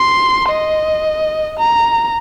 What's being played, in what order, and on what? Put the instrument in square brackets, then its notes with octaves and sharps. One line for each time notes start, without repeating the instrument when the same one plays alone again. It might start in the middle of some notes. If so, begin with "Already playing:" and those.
Already playing: [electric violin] C6
D#5
A#5